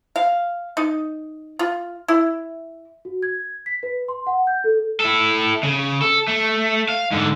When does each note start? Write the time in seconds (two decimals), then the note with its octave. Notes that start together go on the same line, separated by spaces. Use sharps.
0.16 F5
0.77 D#4
1.59 F4
2.08 E4
3.05 F#4
3.23 G#6
3.66 B6
3.83 B4
4.08 C6
4.27 F#5
4.47 G6
4.64 A4
5.00 E4 A4
5.63 C#3
6.02 A4
6.28 A3
6.89 F5
7.11 G#2 D3